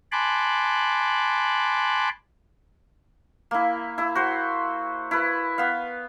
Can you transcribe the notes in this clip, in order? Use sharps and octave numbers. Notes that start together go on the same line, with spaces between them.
G#5 A5 B5 C6 D6 F#6
A#3 E4
E4 E5
F#4 C5
E4 B4
B3 F5